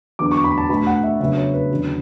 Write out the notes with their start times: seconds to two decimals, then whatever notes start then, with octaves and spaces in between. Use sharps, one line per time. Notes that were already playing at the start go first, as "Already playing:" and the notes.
0.19 E2 D3 F#3 B3 D4 D6
0.32 C#6
0.44 B5
0.58 A5
0.69 B2 A3 D4 B5
0.87 F#5
1.04 E5
1.20 C#3 F#3 B3 D4 E5
1.37 C#5
1.54 B4
1.71 E2 D3 F#3 C#4